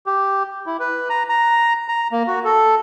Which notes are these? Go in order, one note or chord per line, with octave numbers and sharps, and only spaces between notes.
G4
E4
B4
A#5
A#5
A#5
A#3
F#4
A4